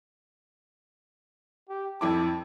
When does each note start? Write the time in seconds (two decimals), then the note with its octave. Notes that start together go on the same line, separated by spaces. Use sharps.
1.69 G4
2.01 F2 E4 A5 D6